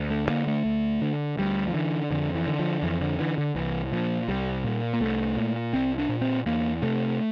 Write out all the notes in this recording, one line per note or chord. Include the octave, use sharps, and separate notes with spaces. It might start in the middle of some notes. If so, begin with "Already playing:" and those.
Already playing: D2
A3
D3 A#3
A3
D2
D3
D2 G3
F3
D3 E3
F2 D3
E3
D3
F3
F2 E3
D3
D3 E3
D3
C2 E3
A#2 F3
C2 G3
A#2
A#3
C2 A3
A#2
C2 C4
D4
A#2
C4
E2 A#3
C3 A3